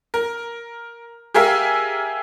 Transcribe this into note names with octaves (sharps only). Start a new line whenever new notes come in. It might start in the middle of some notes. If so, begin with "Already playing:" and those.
A#4
G4 G#4 A#4 E5 F5